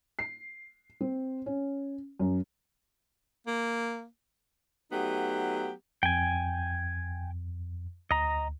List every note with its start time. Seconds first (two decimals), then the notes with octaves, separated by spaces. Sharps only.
0.19 C7
1.01 C4
1.46 C#4
2.19 F#2
3.47 A#3
4.92 F#3 A3 B3 D#4 G4
6.03 F2 G5 G#5
8.11 D2 D#5 A#5